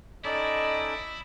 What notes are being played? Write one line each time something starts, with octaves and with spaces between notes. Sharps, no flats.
C#4 D#4 E4 A4 D5 D#5